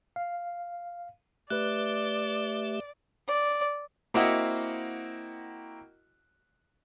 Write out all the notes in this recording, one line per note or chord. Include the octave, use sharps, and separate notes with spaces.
F5
A3 G4 B4 D5 E5 F#6
D5
A#3 C4 E4 F#4 D#5 F#5